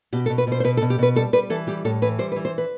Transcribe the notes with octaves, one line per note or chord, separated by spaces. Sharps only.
B2 G4
A4
B2
B4
B2 C5
C5
B2 B4
A4
B2
G4
B2 B4
G3 A4
G3 B4
E3 A4
G3 G4
A2 A4
E3 B4
G3 C5
B4
E3
C5
B4